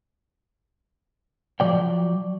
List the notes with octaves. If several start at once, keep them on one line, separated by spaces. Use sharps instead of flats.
F3 F#3 D5 G5